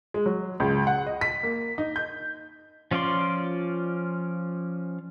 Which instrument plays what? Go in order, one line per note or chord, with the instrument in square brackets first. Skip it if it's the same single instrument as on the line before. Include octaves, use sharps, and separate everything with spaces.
[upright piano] G#3
F#3
C#2
F#5
D#5
B6
A#3
D#4
G6
[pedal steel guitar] F3 C#4 F4 D5 C6